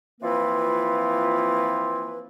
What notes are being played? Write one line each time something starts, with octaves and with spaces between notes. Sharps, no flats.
E3 F3 A#3 C4 F4 B4